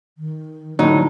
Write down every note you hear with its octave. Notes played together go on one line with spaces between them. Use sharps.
D#3
A2 D3 F#3 D#4